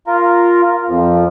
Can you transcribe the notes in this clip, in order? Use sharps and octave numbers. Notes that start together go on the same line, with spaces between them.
F4 A#4
F2 F3